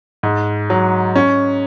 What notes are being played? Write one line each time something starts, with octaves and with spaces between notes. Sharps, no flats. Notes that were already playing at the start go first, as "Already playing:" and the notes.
G#2
F#3
C#4